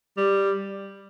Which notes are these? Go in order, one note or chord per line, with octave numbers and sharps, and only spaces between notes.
G3